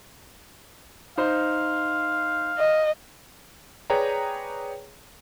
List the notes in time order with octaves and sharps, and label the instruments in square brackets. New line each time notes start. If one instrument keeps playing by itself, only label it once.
[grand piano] D#4 C5 [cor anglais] F5
[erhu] D#5
[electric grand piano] G#4 B4 C#5 D5 G5 A#5